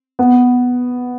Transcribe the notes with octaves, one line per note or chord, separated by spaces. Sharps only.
B3